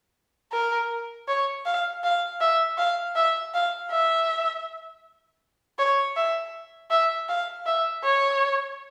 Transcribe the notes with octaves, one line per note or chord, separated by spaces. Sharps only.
A#4
C#5
F5
F5
E5
F5
E5
F5
E5
C#5
E5
E5
F5
E5
C#5